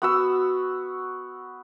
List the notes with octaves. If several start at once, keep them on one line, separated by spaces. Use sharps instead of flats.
B3 F#4 E6